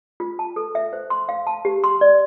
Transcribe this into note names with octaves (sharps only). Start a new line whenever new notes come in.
F4
A5
A4
E5
C5
C6
F5
A5
G4
C6
D5